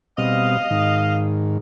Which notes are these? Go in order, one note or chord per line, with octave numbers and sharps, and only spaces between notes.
B2 G3 C4 D#5 F5
G#2 D#3